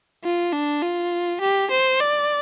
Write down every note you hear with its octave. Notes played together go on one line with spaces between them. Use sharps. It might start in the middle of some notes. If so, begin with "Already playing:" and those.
F4
D4
F4
G4
C5
D5